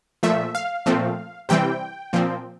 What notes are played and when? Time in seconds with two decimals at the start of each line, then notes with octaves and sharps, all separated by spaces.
0.23 A#2 F3 A3 E5
0.55 F5
0.86 A#2 F3 A3 C4
1.49 C3 E3 G3 C4 G5
2.13 A#2 F3 C4